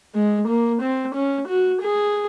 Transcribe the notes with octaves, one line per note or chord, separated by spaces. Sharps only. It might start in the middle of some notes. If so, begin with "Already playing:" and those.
G#3
A#3
C4
C#4
F#4
G#4